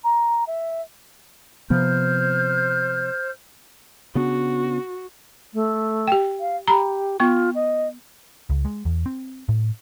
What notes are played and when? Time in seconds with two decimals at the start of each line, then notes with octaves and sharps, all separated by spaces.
0.04 A#5
0.47 E5
1.70 C3 F3 B3 C5 F6 G6
4.15 C#3 B3 D4 F#4
5.54 A3
6.07 G4 G5
6.40 F5
6.68 G4 A#5 B5
7.20 B3 F4 C#6
7.55 D#5
8.50 C#2
8.65 G#3
8.85 E2
9.06 C4
9.49 A2